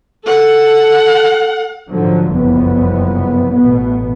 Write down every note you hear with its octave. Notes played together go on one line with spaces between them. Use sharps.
A4 F#5
G#2 D3 F3 F#3
F#1 C2 F2 B3
A1 B2 B3